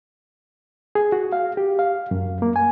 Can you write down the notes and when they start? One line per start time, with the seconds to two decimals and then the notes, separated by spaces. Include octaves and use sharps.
0.95 G#4
1.12 F#4
1.32 F5
1.57 G4
1.79 F5
2.11 F#2
2.42 A#3
2.56 G#5